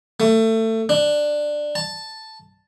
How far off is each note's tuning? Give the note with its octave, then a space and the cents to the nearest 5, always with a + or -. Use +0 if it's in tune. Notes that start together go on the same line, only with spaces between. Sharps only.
A3 +25
D4 +10
A5 +5